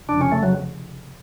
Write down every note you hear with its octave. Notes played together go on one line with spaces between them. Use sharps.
F1 F2 C#3 D4
C#4
A3
F#3